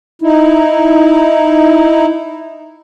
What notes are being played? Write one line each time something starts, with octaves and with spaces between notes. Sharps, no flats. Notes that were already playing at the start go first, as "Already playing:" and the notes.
D#4 E4